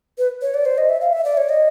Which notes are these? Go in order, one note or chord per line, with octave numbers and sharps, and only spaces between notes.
B4
C#5
D5
C5
D#5
E5
F5
E5
D5
C#5
D#5